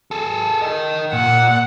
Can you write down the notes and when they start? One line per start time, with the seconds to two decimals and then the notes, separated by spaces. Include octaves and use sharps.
0.11 G#4 A4
0.62 A#4 D#5
1.13 A#2 F#5